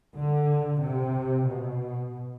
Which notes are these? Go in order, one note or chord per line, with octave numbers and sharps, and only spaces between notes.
D3
C3
B2